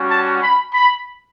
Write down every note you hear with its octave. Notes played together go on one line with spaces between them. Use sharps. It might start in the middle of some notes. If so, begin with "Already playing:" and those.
Already playing: G3 C#4 F#4
A5
B5
B5